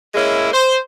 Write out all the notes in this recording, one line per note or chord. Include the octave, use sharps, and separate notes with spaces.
G#3 A#3 C#4 E4
C5